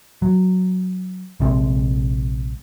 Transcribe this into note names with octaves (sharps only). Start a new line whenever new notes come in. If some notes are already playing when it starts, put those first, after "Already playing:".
F#3
A#1 C3 G#3 C4